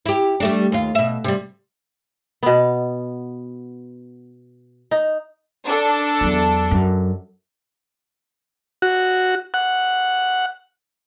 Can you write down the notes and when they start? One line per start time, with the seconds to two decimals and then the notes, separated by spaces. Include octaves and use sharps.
0.06 E4 G4
0.40 G3 A3 D4
0.72 D#2 F4
0.95 B2 E5
1.24 C3 G3
2.43 B2 B3
4.91 D#4
5.65 D4 A4
6.21 E2 F#3
6.71 F#2
8.82 F#4
9.54 F#5